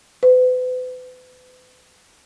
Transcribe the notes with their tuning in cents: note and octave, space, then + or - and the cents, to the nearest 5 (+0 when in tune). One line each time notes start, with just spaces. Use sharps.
B4 +40